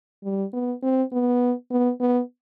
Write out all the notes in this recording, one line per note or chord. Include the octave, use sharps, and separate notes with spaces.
G3
B3
C4
B3
B3
B3